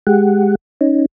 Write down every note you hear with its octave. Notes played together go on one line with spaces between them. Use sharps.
G#3 G4 F#5
C#4 D#4